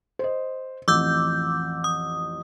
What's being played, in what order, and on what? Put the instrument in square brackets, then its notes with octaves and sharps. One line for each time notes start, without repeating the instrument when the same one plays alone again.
[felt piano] C5 D#5
[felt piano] A1 F2 [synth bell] D6 E6 G6
[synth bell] D#6